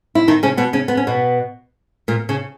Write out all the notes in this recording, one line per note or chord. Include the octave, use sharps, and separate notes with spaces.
E4
D#3 D#4
C#3 C#4
B2 B3
C#3 C#4
B3
C#4
B2 B3
A#2 A#3
C#3